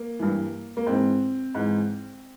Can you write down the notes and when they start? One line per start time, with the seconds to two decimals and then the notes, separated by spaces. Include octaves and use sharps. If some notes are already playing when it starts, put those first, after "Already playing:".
Already playing: A#3
0.19 G2 E3
0.77 A#3
0.86 G#2 E3 C4
1.55 G#2 E3